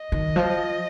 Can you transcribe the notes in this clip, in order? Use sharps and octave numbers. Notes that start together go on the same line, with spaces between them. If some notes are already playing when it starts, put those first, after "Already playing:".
Already playing: D#5
D#3
F3